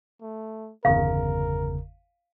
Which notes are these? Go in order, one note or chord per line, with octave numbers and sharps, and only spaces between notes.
A3
G1 E2 C#3 A#4 F5